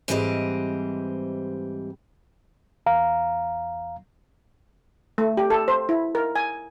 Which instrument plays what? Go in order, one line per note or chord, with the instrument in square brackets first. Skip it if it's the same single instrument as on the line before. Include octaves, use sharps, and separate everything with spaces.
[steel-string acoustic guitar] G#2 E3 G3 C4 G4 D#5
[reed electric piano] E2 F5 A#5
[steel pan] A3
G4
A4
C5
E4
A#4
G#5